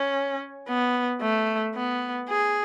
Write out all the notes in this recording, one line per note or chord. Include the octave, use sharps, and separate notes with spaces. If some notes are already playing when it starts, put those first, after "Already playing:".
Already playing: C#4
B3
A3
B3
G#4